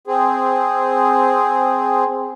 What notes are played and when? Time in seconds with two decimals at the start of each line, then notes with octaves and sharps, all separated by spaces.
0.07 C4 G#4